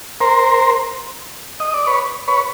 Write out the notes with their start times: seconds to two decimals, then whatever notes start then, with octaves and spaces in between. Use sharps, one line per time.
0.21 A#4 C5
1.60 D#5
1.74 D5
1.86 B4 C#5
2.28 B4 C#5